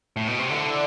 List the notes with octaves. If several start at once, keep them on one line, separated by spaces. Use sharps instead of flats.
A2
B2
C3
D3 E4 A4 D5